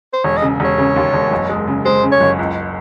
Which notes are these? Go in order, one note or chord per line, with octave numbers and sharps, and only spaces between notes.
C5
E1 C#5
D#5
C#3
E1 C#5
C#3
D#2
E1
F#1
G#3
C#3
G#3 C5
C#3
C#5
F#1
C#2